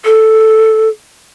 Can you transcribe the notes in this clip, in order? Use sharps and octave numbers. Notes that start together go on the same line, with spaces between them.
A4